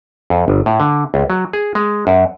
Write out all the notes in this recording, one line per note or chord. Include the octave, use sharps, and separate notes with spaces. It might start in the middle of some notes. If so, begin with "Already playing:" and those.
F2
G1
A2
D3
C#2
F#3
G#4
G#3
F#2